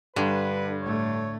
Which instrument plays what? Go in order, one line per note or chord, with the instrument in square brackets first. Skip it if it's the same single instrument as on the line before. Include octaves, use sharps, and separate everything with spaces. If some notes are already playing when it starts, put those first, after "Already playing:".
[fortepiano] G2 [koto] D3 [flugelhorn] B4
[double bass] A2 A3 [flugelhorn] C#5